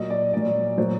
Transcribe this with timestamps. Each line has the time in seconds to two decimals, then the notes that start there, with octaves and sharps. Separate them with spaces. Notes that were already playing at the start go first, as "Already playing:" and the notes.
Already playing: A#2 F#3 D#5
0.10 D5
0.33 A#2 F#3 D5
0.78 A#2 F#3 C5